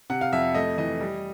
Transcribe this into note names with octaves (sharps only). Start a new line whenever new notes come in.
C3 F#5
F5
F2 E5
A3 D#5
E3 D#5
G3